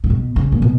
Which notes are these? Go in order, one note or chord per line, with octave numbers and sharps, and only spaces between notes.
C#3
B2
C#3
A#2
B2